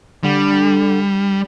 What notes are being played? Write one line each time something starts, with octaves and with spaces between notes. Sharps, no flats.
D3 G3